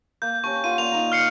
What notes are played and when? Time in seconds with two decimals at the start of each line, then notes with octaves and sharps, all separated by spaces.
0.22 A#3 G6
0.44 C#4 G4 A5 C#6
0.64 A#3 F4 F#5 D#7
0.78 A#3 D5 F7
0.92 D#4 A#4
1.12 F6 C7 C#7